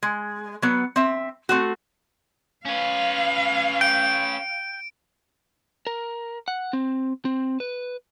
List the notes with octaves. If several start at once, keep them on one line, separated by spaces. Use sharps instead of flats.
G#3
F#3 B3
C4 E5
A3 C4 F#4
C#4 B4 F5
G5 D7
A#4
F#5
C4
C4
B4